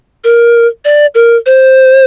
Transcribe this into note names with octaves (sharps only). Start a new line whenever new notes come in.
A#4
D5
A#4
C5